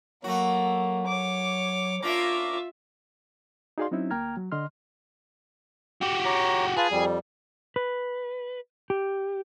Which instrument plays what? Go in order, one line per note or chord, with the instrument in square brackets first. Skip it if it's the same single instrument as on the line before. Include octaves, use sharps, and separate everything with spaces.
[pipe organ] F#3 [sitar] A3 F#4 [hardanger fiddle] A#3
[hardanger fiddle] C#5 D6
[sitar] A#3 C#4 D4 [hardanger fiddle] F4 E5 [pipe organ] D6
[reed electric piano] D#4 F#4 G#4 D5 F5 C6
F#3 C4 C#4 D#4 E4
D2 A#3 G5 A#5 F6 G#6
F#3
D3 D#5 C6 F6
[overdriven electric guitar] F#4 G4
[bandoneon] C#5 A#5 D6
[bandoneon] F4 B4 A5 [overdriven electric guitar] G#4
[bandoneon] F2 G3
[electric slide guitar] B4
G4